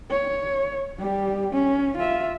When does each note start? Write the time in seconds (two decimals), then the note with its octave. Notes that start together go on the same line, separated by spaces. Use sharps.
0.10 C#5
0.98 G3 G4
1.52 C#4
1.97 F4 E5